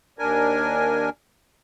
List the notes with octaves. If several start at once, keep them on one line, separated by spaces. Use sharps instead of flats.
D#2 D4 A#4 G#5